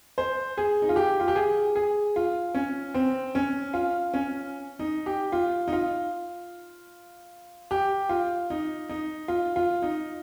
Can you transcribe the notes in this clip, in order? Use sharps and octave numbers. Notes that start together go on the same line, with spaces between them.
C5
G#4
D#4
F4
G4
F4
G4
G#4
G#4
F4
C#4
C4
C#4
F4
C#4
D#4
G4
F4
D#4
F4
G4
F4
D#4
D#4
F4
F4
D#4